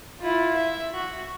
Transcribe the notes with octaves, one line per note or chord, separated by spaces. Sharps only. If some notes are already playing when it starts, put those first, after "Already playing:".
E4 F4
E5
F#4